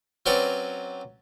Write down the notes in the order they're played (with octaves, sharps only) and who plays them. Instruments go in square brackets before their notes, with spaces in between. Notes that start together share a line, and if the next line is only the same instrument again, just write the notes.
[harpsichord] F#3 C4 C#4 B4 D5 C#6